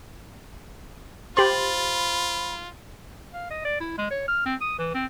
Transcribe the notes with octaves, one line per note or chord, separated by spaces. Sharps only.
F4 G4 C5 B5 C6 A6 F#7
F5
D#5
D5
E4
G#3
C#5
F6
C4
D#6
E3
C4